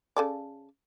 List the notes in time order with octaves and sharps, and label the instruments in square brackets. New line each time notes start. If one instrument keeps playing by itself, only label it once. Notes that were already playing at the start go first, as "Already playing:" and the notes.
[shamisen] C#3 A4 D5